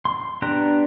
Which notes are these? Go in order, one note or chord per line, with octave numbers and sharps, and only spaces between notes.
C6
B3 D4 G4 A#5 F#6